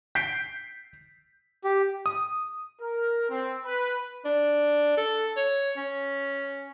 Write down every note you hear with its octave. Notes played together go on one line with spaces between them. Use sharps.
G6 B6 C7 D7
G4
D#6
A#4
C4
B4
D4
A4
C#5
C#4